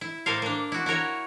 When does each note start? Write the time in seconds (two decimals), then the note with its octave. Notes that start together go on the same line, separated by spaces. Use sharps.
0.01 E4
0.26 A2 A#3 A4 A#4 C5 F5
0.42 A#3 D4
0.72 E4 F#4
0.86 E4 F#4 A#4 C#5